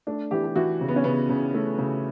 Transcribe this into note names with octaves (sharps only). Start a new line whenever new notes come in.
A3 D4
E3 G4
G4
E3 F#4
C#3
B3
C#4
C#3 B3
C#3
A3
C#3